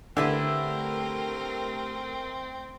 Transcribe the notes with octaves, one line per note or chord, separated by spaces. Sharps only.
D3 A3 C4 E4 G4 A#4 B4